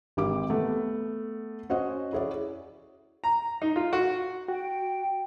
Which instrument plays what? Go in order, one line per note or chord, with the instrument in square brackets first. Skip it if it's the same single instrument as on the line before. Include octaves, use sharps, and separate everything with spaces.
[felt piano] G#1 G4 D6
A3 B3
C#4 F#4 C5 D#5
E4 G#4 C#5 D5
[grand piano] A#5
D#4
F4
F#4
[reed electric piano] F#4 [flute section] G5